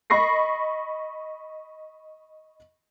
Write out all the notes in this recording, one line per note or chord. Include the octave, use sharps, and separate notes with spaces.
D#5 B5 C#6 A#6 C7